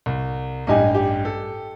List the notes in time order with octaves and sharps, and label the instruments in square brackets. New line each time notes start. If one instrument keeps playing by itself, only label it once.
[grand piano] C2
[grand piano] A1 G2 G#5 [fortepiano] D#4 G4 D#5
[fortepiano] G4
[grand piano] A4